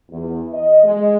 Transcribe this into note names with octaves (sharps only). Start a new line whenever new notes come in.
E2
D#5
G#3